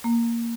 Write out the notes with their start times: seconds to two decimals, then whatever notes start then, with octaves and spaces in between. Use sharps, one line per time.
0.04 A#3